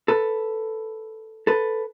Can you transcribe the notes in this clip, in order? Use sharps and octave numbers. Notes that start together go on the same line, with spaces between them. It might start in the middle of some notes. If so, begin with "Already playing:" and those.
A4 B4
A4 B4